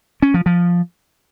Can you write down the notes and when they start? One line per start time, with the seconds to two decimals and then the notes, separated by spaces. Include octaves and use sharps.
0.22 C#4
0.34 F3
0.46 F3